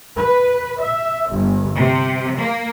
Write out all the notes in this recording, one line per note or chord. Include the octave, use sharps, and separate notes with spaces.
B4
E5
G1
C3
A#3